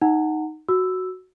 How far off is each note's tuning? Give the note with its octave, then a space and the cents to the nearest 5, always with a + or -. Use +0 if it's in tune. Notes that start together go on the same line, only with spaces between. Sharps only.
D#4 +0 F#5 +0 A#5 -35
F#4 +0 E6 +0